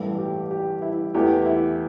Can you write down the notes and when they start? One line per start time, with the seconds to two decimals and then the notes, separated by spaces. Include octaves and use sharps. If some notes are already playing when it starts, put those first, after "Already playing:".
Already playing: A1 G2 E3 G3 A4
0.19 G4
0.51 G4
0.82 E4
1.14 E2 E3 A3 G4
1.46 E4